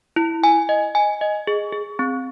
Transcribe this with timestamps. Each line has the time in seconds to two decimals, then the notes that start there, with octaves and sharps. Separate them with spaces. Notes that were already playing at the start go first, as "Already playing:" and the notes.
0.16 E4
0.44 G#5
0.69 D#5
0.95 G#5
1.21 D#5
1.47 G#4
1.72 G#4
1.99 C4